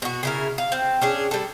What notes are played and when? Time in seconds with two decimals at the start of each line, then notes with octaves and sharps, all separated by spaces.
0.02 B2 F#4
0.23 C#3 E4 A#4
0.58 F5
0.72 C4
1.02 C#4 D4 G#4
1.31 G3 A4